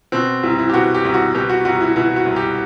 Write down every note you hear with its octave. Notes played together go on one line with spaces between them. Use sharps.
B2 C4
C2 E4
E4
G4
B2 F#4
G4
C2
F#4
B2 G4
F#4
C2 F#4
E4
B2 E4
F#4
C2
G4